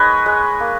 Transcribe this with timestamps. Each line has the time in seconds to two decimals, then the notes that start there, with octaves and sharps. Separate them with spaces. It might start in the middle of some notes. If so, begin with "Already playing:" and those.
Already playing: G#3 D#4 B4 C#5 D#5
0.26 G#3
0.60 A#3